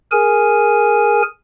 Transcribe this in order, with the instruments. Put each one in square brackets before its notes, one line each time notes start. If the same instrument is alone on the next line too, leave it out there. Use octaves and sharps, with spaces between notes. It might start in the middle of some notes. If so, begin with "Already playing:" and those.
[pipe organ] G#4 A#4 G#5